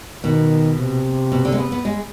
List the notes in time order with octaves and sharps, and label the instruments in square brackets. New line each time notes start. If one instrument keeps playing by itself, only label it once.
[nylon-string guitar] B2 [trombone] D#3
[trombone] C3
[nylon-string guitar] B2
D3
G#3
B3
B3
G#3